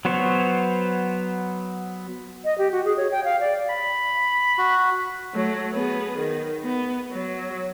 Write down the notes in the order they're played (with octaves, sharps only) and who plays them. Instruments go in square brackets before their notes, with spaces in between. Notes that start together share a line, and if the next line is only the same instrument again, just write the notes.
[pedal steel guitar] F#3 B3 C5 C#5
[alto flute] D#5
G4
F#4
G#4
C#5
G5
F5
D5
[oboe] B5
[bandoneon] F#4
[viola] F#3 A3
B3 G#4
D#3
B3
F#3